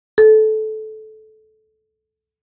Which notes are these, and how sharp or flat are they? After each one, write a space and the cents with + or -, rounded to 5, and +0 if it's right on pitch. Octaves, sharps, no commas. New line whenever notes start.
A4 -20